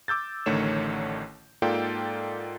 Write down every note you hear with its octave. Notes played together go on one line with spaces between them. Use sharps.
D6 E6 G6 A6
A1 D3 D#3 A3 C#5 E7
G#2 A#3 F4 A4 D5 G5